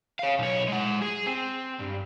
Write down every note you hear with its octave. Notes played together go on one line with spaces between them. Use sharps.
C#5 F5
B1 C#5
G#3 F#5
G#4
C4
G2